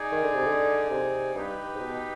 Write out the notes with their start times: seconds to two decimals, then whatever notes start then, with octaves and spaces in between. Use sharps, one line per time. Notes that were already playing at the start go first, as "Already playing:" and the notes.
Already playing: D#4 G#4 D5
0.12 D#3
0.23 D3
0.34 C3
0.46 D3
0.91 C3
1.35 G2 D#4 G4 B4
1.74 G#2
1.80 B2